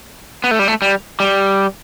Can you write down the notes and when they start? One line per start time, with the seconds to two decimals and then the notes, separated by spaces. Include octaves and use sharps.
0.44 B3
0.51 A3
0.59 G3
0.68 A3
0.82 G3
1.20 G3